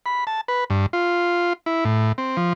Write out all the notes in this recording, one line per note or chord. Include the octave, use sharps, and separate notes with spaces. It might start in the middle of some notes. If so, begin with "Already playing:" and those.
B5
A5
B4
G2
F4
E4
A2
C4
F3